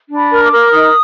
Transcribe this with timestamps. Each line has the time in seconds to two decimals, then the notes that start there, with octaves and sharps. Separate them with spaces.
0.10 D4
0.17 B5
0.30 A#4
0.44 D6
0.52 A#4
0.71 D#4 D#6